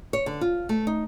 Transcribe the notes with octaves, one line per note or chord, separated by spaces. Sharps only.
C#5
D3
F4
A3
D#4